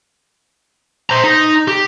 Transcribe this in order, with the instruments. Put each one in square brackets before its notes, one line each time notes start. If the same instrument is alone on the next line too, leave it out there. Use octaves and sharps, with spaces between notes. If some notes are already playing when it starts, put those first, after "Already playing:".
[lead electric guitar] C5 A#5
D#4
G4